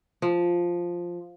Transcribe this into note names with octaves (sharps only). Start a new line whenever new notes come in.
F3